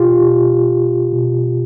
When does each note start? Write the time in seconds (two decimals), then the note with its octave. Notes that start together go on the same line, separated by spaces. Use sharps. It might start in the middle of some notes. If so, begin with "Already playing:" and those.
Already playing: B2 F4 G4
0.20 B2
1.12 B2